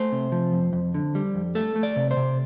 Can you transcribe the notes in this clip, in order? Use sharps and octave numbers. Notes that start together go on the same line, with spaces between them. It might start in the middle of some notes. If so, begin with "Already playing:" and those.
Already playing: A3 C5
C3
F3
F2
F2
D3
G3
F2
A3 A4
A3
D5
C3
C5
C3